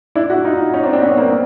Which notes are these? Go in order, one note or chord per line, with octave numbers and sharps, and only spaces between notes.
D4 E4
E4 F#4
D#4 F4
C#4 D#4
C4 D4
C4 D4
B3 C#4
A#3 C4